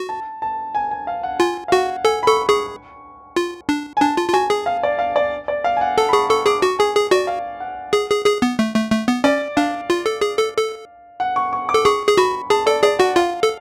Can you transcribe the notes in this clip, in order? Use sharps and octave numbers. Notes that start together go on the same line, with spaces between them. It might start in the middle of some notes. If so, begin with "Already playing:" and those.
Already playing: F#4
A5
A5
G#5
G#5
F5
F#5
F4 G#5
F5
F#4 F#5
A4 G#5
B5
A4 C#6
G#4 C#6
F4
D4
G#5
D4 A5
F4
F4
F#4 G#5
G#4
F5
D5
F5
D5
D5
F5
G#5
F#5
A4 A5
B5
G#4 C#6
A4 C#6
G#4 D6
F#4 C#6
G#4 G#5
G#4
F#4 D5
F5
F#5
G#4
G#4
G#4
B3
A3
A3
A3
B3
C#4 D5
D4 F5
F4
A4
G#4
A4
A4
F#5
C#6
C#6
A4 D6
G#4 C#6
G#4
F#4 B5
G#4 A5
A4 D5
G#4 D5
F#4 F#5
F4 F5
A4